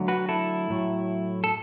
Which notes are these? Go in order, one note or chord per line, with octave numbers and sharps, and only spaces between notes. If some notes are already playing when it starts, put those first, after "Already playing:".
Already playing: D2 D3 F#3
F#4 B4
E4 A4
A2 F#3 A3
A4